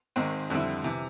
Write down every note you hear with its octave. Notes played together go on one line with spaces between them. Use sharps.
G#1 G#2 D#3 G#3 C4
F2 D3 G3 C4 E4
C3 E3